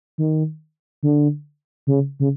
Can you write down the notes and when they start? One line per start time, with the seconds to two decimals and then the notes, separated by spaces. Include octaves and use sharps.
0.18 D#3
1.03 D3
1.87 C#3
2.20 C#3